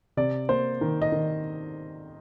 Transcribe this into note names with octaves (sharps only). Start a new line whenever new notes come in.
C3 D5
A#3 C5
D#3
D#5
D#3